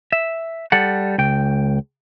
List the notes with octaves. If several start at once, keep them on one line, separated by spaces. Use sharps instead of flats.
E5
G3 A4 F#5
C#2 G5